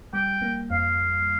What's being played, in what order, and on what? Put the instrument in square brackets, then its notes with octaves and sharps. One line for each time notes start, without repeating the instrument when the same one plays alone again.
[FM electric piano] G3 [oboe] G5
[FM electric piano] A#3
[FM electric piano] F2 [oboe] F5